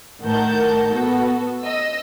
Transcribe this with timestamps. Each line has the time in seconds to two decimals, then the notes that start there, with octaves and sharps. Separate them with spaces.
0.23 A2 D#3 A#4 F#5 A5 G6
0.94 B3 F#4 A4
1.64 D#5 E6